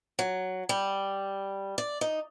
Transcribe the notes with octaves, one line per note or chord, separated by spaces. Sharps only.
F#3
G3
D5
D#4